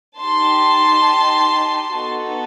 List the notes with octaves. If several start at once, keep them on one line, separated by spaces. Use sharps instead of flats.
D#4 G4 A5 C6
B3 D#4 F#4 A4